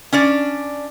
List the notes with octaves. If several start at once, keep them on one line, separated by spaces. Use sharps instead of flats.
C#4 D4 D5